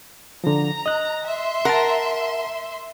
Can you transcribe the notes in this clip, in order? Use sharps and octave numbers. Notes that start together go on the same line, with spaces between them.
D3 F3 A#5
D#5 F#6
E5 C6
A#4 F#5 A5